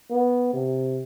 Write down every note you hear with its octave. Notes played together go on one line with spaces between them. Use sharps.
B3
C3